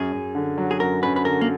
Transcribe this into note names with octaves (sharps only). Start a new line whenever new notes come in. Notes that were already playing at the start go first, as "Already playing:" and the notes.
Already playing: F#2 G#4
F#2
D3
F#3
G#4
F#2 A#4
F#2 B4
B4
D3 A#4
A#3